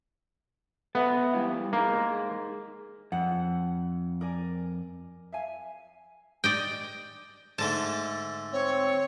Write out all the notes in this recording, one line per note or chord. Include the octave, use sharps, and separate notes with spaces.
B3 A4 E5 F#5
G3 E4 F5
A#3 D#4 G#4
F2 F#5
A#4 D5 G#5
E5 F5 G#5
D5 D#5 G5
G#2 D3 A3 A5
C4 C#5